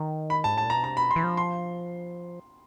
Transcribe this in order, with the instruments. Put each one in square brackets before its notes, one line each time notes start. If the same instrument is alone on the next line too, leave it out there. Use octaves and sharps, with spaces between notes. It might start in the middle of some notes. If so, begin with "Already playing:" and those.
Already playing: [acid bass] D#3
[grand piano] B5
[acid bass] G#2 [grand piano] A5
[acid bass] A2 [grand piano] A5
[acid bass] A#2
[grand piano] A#5
[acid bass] B2
[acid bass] C3 [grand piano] A#5
[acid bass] B2 [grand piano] B5
[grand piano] C6
[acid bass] E3
F3
[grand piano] C6